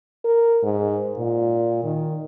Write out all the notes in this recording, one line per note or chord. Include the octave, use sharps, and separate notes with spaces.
A#4
G#2
A#2
D#3